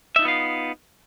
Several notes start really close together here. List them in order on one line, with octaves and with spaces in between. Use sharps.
E5 D#4 F4 B3 F5